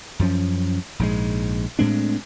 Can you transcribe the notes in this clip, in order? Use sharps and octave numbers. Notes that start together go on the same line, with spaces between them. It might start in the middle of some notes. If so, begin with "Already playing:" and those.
F#2 F3 C#4
A#1 G#2 D3 G#3
A2 G#3 C4 D4